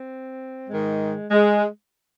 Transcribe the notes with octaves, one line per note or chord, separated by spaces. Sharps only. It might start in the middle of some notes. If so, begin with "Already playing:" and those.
Already playing: C4
G#2 D#3 G#3
G#3